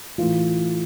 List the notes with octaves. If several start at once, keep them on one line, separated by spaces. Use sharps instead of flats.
A2 E3 F4